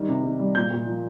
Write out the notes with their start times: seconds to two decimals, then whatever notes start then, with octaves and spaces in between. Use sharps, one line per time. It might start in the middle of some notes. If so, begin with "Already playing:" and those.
Already playing: D#3 G3
0.08 C3
0.24 D#3
0.39 G3
0.55 A#2 G6
0.70 A#2
0.86 F3